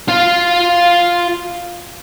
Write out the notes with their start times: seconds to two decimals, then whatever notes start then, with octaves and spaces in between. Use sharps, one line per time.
0.09 F4 F5